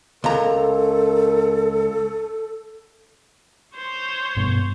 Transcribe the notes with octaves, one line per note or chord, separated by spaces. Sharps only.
C#2 A4 A#4 A#5
C5 C#5
G2 B2